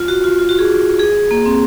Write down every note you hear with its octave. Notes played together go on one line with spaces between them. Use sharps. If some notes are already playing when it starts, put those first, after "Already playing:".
Already playing: F4
F#4
F4
F4
F#4
G#4
G#4
A#3
C4